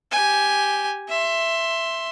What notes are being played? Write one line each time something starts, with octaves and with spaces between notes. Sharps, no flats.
G4 G#5
E5 C6